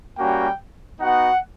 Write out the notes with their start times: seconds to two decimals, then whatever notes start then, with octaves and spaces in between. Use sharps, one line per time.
0.18 G3 A#3 C#4 F#4 G5
1.01 B3 D#4 F#4 F#5